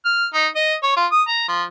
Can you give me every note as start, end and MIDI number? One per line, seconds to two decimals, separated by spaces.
0.05 0.26 89
0.34 0.47 63
0.55 0.74 75
0.83 0.96 73
0.97 1.06 65
1.11 1.22 87
1.28 1.47 82
1.48 1.63 53